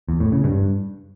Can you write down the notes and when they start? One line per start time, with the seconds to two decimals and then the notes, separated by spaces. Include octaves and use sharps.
0.09 E2
0.20 A2
0.32 C#3
0.44 G2